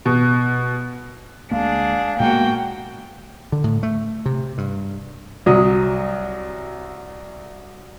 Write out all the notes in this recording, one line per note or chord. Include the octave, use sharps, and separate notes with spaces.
B2
D2 G#3 A#3 D4 G#4 F5
A#2 G#3 A#3 B3 F#4 G5
D3
A2
A3
C3
G2
C2 F#3 D#6